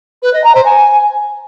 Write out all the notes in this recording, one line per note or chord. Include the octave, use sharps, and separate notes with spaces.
B4
D#5
A#5
C5
G#5